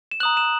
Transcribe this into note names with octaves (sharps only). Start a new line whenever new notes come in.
E7
A#5 D#6 F#6 F#7
E7